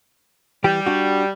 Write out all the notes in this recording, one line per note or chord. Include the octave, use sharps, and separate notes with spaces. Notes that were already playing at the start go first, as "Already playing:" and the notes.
E3 G3 G4
D4 F#4